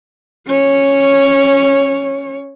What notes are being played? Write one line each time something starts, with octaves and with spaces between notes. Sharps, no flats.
C#4 C#5